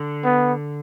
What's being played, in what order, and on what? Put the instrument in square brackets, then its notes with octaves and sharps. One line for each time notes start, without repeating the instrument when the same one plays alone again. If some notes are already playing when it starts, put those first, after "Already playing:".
Already playing: [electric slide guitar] D3
[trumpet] B3